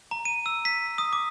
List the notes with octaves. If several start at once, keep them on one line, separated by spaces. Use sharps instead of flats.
A#5
D#7
E6
B6
D#6
D6